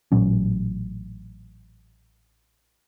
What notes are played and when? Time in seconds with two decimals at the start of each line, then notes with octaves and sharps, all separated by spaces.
0.12 A1 A#2 F#3 C#4